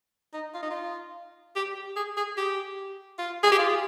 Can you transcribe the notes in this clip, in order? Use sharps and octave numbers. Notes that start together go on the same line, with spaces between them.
D#4
F4
D#4
F4
G4
G#4
G#4
G4
F4
G#4
G4
F4